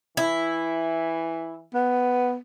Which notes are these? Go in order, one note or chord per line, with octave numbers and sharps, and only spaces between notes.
E3 E4
B3